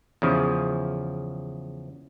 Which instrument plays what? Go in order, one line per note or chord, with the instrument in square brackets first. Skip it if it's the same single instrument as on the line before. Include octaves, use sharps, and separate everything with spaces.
[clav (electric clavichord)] E2 C#3 F3